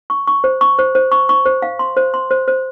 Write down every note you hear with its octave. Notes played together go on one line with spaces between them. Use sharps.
C#6
C#6
C5
C#6
C5
C5
C#6
C#6
C5
F5
C6
C5
C6
C5
C5